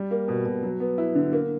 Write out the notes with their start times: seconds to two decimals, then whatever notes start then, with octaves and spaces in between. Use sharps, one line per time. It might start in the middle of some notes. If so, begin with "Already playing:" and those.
Already playing: G3
0.11 A#3
0.28 B2
0.45 B2
0.63 F#3
0.80 B3
0.98 E4
1.15 D3
1.33 A#3